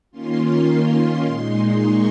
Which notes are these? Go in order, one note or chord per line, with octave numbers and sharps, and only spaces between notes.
D#3 A#3 C#4 F4 C6
A#2 G#3 D#4
C#6